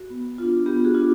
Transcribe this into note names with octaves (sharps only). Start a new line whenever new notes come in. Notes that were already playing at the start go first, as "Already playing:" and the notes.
Already playing: F#4
B3
D4 F4
B3 G4
F#4 G#4
D4 F4